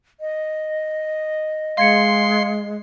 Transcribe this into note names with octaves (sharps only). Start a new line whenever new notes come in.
D#5
G#3 F5 C6 G#6 C#7